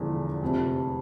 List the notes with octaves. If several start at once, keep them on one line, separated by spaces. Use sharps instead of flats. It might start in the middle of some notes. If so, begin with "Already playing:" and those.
Already playing: E1 E2 D3 F3
F1 F2 C3